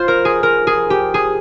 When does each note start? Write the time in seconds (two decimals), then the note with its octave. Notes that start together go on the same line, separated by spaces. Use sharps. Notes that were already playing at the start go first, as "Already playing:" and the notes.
Already playing: F4 C5
0.08 A#4
0.25 G#4
0.43 A#4
0.67 G#4
0.90 G4
1.14 G#4